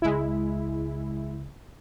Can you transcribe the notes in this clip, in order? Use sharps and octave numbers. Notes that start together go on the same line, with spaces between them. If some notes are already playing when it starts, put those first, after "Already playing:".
C#2 C#3 G#3 E4